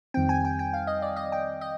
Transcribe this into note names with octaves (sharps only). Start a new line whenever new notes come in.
F2 D#3 G3 C4 G5
G#5
G5
G5
F5
D#5
D5
D#5
G5
D#5